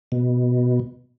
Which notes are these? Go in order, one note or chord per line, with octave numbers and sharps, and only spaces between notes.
B2